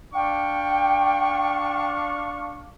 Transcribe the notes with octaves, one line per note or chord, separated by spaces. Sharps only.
D4 F5 G5 C#6